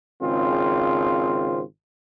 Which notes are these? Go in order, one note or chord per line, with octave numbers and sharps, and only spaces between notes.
G#1 C#3 C4 F4